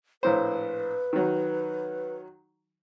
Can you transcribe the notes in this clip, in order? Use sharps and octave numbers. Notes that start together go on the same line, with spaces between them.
A#1 A2 B4 C5
D#3 F#3